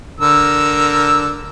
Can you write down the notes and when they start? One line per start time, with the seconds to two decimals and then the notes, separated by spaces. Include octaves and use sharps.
0.20 D3 A#4 E6